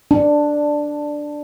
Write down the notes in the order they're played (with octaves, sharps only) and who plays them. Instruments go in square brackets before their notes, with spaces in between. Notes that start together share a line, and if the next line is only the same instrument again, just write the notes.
[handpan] D4